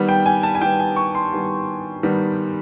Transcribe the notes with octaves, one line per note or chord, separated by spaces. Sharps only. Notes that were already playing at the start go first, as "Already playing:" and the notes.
Already playing: D#3 G3 B3
G5
G#5
A5
G#5
D#3 G3 B3 G5
G#5
C#6
C6
D#3 G3 B3
D#3 G3 B3